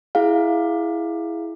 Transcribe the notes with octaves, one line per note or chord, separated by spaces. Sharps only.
E4 G#4 F5